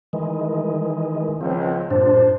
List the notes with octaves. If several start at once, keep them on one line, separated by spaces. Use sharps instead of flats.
D#3 E3 G#3
C#2 F3 C4
G2 A#2 D4 C5